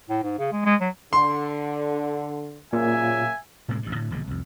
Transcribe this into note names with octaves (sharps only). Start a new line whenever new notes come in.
A2
G#2
C#3
G#3
G#3
F#3
D3 C6
A#2 C#3 F#3 A#3 E5 G#5
A2 C3 G#3 A#3
A1 G2
A2 D3
E1 A#1 D3 G#3
C2 F2